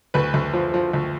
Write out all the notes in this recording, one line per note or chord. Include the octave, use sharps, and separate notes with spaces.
D2 B4
D2
F3
F3
D2